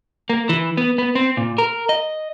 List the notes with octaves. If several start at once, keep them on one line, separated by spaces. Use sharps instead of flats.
A#3
E3
B3
B3
C4
A#2
A#4
D#5